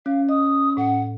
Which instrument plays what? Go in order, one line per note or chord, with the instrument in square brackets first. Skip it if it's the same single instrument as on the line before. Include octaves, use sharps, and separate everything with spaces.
[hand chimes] C#4 [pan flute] F5
[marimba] D#5 [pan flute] D#6
[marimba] A2 [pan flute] F#5